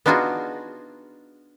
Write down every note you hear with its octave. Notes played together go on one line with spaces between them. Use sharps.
B3 D4 D#4 F4 F#4 G#4